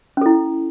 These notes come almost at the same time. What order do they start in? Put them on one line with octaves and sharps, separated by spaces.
C#4 A4 E4